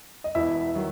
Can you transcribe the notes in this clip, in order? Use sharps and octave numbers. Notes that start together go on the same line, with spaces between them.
D#5
E1 E2 B2 E4 E5
D#3 F#3